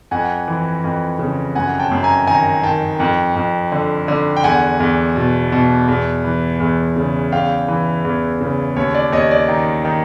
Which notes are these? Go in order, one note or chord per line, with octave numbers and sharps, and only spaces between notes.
F2 F#5 G#5
E3
F2
C#3
F#2 F#5 G#5
G5 A5
F#2
G#5 A#5
D#3 G#5 A#5
D#3 G5 A5
F2
F2
D3
D3
G5
E2 F#5 G#5
E2
B2
B2
E2
E3
E2
C#3
E2 F5 G5
E3
E2
C#3
D#2 C#5
D5
D#2 C#5 D#5
D5
D#3
D#3